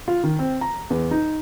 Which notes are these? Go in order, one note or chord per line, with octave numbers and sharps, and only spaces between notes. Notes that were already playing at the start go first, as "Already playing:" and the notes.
F4
D#3
C4
A#5
E2
D#4